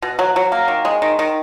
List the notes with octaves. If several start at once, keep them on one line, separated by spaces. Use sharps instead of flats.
B2
F#3
F#3
A#3
D#3
G#3
D#3
D#3